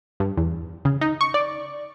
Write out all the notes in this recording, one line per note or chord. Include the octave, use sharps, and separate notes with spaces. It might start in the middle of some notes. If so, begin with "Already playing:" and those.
G2
E2
C#3
D#4
C#6
D5